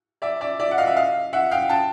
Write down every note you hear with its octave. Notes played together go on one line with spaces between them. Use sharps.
D5 E5
D5 E5
D5 E5
F#5
D#5 F5
E5
D#5 F5
E5 F#5
F5 G5
G5 A5